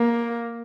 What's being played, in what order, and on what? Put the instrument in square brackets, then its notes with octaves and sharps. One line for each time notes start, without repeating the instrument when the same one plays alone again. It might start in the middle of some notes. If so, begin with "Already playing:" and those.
Already playing: [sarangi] A#3